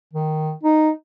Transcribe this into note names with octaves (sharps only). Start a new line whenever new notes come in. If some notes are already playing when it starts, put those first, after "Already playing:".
D#3
D#4